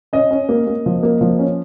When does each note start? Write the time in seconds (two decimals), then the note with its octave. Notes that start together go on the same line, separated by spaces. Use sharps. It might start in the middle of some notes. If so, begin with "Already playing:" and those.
0.13 C#4 D#5
0.31 C#4
0.49 A#3
0.67 A#3
0.86 F3
1.03 A#3
1.21 F3
1.39 C#4